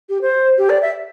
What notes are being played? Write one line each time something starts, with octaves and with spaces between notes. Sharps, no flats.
G4
C5
G4
D5
E5